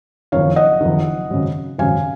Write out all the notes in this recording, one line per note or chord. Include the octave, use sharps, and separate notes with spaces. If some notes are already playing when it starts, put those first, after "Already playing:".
F#1 F2 D#3 C#5 F5
D#5 F#5
F#1 F2 D#3
G#1 F#2 C#3
G#1 F#2 C#3 F5 G#5